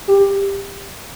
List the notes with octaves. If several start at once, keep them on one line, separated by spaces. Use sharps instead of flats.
G4